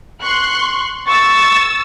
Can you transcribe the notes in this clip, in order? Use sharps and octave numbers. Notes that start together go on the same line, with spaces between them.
C6 C#6 F#6
C#6 E6 A6